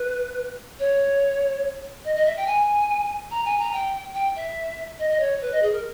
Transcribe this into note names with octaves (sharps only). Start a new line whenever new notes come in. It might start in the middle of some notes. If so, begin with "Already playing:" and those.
Already playing: B4
C#5
D#5
D#5
E5
G5
G#5
A#5
G#5
A#5
G5
G5
E5
D#5
D#5
C#5
B4
D#5
G#4
A#4